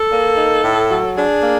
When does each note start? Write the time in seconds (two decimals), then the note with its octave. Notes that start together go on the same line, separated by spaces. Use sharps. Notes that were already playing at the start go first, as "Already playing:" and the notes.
Already playing: A4
0.09 A#3
0.36 D#4
0.63 A2
0.90 F#3
1.16 D4 G#4
1.43 A#3